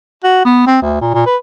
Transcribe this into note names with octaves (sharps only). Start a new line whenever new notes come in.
F#4
B3
C4
D2
A#2
A#2
B4